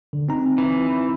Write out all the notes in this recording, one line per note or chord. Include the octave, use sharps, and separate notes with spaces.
D3
C4 D#4 A#5
E3